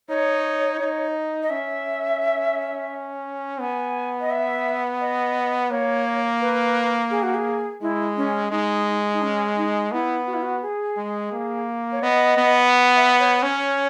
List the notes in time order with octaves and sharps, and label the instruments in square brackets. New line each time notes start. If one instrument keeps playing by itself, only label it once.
[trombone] D#4 [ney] C#5
[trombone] D#4
[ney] D#5
[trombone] C#4 [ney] E5
[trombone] B3 [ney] G#5
[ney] D#5
E5
D#5
[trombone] A#3 [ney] C#5
[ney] B4
G#4
F#4
G#4
[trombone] G#3 [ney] E4
[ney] C#4
[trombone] G#3 [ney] D#4
[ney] D#4
C#4
D#4
[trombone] B3 [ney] E4
[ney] F#4
E4
F#4
G#4
[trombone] G#3
A#3
[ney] C#5
[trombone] B3 [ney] D#5
[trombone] B3
[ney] E5
C#5
[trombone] C#4 [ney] C#5